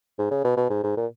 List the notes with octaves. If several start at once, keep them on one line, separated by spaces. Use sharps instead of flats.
G#2
C#3
B2
B2
G#2
G#2
A#2